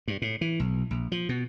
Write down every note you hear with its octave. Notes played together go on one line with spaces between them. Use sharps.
G2
A2
E3
B1
A#1
F3
B2